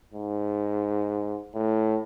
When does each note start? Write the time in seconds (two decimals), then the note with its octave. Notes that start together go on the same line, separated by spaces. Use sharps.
0.14 G#2
1.54 A2